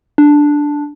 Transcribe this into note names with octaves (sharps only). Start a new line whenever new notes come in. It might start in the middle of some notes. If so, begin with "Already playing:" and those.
D4